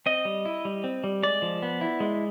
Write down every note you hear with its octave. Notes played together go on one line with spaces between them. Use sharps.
C4 D#5
G3
E4
G3
C4
G3
G#3 D5
F3
B3
E4
G#3